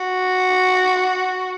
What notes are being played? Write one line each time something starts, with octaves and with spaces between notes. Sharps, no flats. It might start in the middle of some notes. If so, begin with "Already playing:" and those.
Already playing: F#4